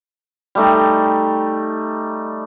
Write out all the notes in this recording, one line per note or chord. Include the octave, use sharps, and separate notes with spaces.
G3 A3 D#4